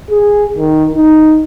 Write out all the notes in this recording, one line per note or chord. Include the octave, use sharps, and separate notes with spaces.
G#4
D#3
D#4